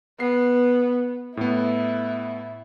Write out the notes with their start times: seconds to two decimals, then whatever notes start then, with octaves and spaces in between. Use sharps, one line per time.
0.20 B3 C7
1.37 A2 B3 E4